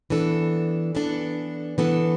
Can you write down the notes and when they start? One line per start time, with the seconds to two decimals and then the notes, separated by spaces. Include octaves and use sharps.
0.10 E3 B3 D4 A4
0.95 E3 B3 D4 A4
1.78 E3 B3 D4 A4